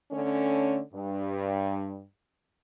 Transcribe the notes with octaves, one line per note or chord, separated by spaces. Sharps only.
D3 A3 C#4
G2